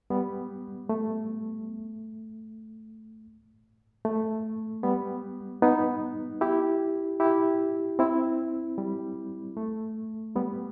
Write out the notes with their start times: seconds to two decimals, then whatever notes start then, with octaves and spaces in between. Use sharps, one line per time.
0.10 G3 B3
0.89 A3
4.05 A3
4.83 G3 B3
5.62 B3 D#4
6.41 E4 G4
7.20 E4 G4
7.99 C4 E4
8.78 G3
9.57 A3
10.36 G3 B3